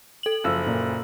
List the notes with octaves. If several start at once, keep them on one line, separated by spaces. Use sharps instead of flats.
A4 F#7
F#1 F3 E6
A#2